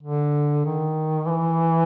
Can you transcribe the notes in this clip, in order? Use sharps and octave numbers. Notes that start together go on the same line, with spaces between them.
D3
D#3
E3